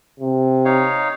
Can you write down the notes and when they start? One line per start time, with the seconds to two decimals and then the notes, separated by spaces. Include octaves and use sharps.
0.20 C3
0.65 D#4 C#5 F5